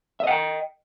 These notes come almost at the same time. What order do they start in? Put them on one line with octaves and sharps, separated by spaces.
E5 D#5 F#5 G5